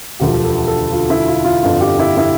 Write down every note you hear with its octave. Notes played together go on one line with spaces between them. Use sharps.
E1 D2 D3 F3 G4
A4
A4
F4
E4
F4
F4
G1 F2 D3 F3 F4
G4
E4
E4